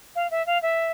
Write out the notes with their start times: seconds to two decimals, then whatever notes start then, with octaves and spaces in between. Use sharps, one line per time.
0.16 F5
0.31 E5
0.46 F5
0.62 E5